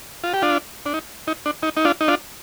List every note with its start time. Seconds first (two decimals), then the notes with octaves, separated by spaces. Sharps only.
0.24 F4
0.34 G4
0.42 D4 F4
0.86 D4
0.94 D#4
1.27 D#4
1.46 D4
1.63 D#4
1.77 D#4
1.85 D4 F4
2.01 D#4
2.08 D4 F4